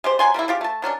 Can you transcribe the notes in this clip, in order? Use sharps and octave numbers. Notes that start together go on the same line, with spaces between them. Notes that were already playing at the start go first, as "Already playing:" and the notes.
G#3 G4 C5
C3 F#3 G#5 C6
G3 A#3 C#4 E4
C#3 F4 G4
A3 A5
D#3 F#3 C#4 D4